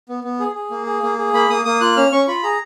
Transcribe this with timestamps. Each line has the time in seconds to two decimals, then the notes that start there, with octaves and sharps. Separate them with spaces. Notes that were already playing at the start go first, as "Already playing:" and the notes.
0.09 B3
0.24 B3
0.40 G#4
0.55 G#4
0.71 A#3
0.86 G#4
1.03 A#3
1.18 G#4
1.33 A#3 B5
1.49 A#3 D#6
1.65 A#3 D#6
1.81 F4 F#6
1.97 C#4 F6
2.12 C#4 C#6
2.28 F4 B5
2.43 G#4 A#5